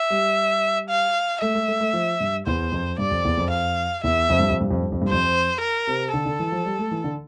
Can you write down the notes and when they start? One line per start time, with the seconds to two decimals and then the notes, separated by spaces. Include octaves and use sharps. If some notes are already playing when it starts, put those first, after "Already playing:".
Already playing: E5
0.10 G3
0.89 F5
1.42 A3 E5
1.55 A3
1.68 A3
1.80 A3
1.93 F3
2.20 G2
2.47 E2 C5
2.72 F2
2.98 G2 D5
3.11 F2
3.25 E2
3.38 F2
3.50 F5
4.03 E2 E5
4.30 F2
4.39 G2
4.50 F2
4.61 G2
4.71 F2
4.82 G2
4.92 F2
5.02 G2
5.09 F2 C5
5.61 A#4
5.87 C3
6.13 D3 A4
6.26 D3
6.39 E3
6.52 F3
6.65 G3
6.79 A3
6.91 E3
7.04 D3